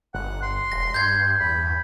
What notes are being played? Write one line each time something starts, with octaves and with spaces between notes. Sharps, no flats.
G1 F#5
C6
E1 A#6
G2 G6 G#6
E2 B5